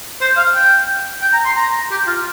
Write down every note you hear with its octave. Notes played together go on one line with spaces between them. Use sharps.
C5
F5
G5
G5
A#5
C6
A#5
G4
F4